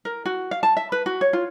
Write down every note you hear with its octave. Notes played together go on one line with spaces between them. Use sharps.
A#4
F#4
F5
A5
E5
B4
F#4
C#5
F4